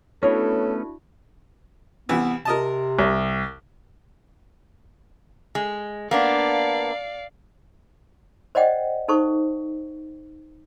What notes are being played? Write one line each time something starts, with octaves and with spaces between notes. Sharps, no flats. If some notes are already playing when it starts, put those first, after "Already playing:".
A3 B3 C#4 D4 E4 F#4 A4 C#5
C2 E3 B3
C3 A#4 D#5 A5
C2
G#3
A#3 B3 D4 D5 F5
C5 D5 D#5 F#5 G5
D#4 A4 C5 C#6